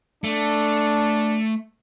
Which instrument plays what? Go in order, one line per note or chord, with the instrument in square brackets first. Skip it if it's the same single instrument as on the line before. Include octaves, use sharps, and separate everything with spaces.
[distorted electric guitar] A3 [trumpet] D4